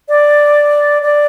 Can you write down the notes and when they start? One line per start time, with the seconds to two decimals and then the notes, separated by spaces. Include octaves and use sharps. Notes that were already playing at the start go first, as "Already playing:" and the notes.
0.09 D5
1.02 D5